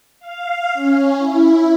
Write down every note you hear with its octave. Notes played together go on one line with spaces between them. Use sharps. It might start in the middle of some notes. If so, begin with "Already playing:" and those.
F5
C#4
E4